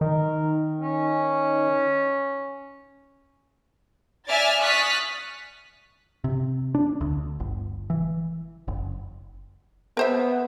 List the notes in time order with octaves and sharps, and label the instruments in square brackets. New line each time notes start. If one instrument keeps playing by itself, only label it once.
[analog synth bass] D#3 [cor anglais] A#4
[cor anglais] C#4
[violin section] D5 E5 G#5 F6 A6
C#6 D#6 F6 F#6 A6 B6
[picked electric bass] C3
D4
D2
G1
E3
F#1
[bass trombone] B3 [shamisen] A#4 C5 E5